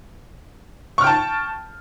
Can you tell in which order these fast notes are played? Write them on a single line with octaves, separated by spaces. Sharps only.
C#6 F6 G5 A5